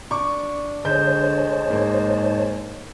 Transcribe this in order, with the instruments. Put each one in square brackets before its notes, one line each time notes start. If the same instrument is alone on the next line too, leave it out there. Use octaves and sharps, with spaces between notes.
[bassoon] D4 [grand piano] C#6 D6
[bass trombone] D3 [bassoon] G#3 [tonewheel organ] C5 C#5 A5 [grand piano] G6
[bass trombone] G#2 [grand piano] A#3